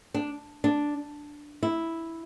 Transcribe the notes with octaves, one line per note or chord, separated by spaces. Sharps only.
D4
D4
E4